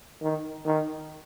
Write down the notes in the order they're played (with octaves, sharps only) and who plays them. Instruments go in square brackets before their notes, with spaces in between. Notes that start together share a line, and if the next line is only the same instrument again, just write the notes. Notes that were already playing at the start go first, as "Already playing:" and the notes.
[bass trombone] D#3
D#3